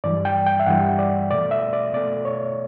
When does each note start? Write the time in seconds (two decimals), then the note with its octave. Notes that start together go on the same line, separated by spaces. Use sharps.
0.04 G2 E3 G3 D5
0.25 G5
0.46 G5
0.60 E5
0.66 G2 E3 G3 F#5
0.99 D5
1.31 B2 A3 D5
1.51 E5
1.73 D5
1.93 B2 A3 D5
2.25 C#5